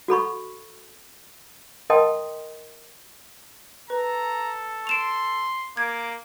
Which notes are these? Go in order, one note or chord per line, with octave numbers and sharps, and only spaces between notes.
F#4 A4 B5 C#6
A#4 D#5 G5 A5 C6 D#6
A4 B4 A#5
C6 D7 E7 F7
A#3 D6 G#6